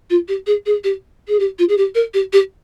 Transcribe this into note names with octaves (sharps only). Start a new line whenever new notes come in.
F4
G4
G#4
G#4
G4
G#4
G4
F4
G#4
G4
A#4
G4
G4